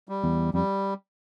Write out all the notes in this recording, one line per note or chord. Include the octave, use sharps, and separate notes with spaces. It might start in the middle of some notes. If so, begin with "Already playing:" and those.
G3
E2
F2 G3